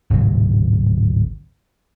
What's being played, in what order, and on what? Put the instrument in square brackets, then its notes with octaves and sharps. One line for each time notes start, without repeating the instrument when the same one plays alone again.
[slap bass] D1 G#1 C3 F#3